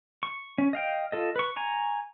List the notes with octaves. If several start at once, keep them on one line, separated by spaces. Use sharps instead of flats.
C#6
C#4
D#5 F5 G5
F4 A4 D#5
B4 C#6
G#5 A#5 C#6